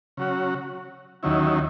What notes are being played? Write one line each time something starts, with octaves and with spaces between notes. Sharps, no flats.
C#3 F#3 C#4 F#4
D#2 D#3 F#3 C#4 E4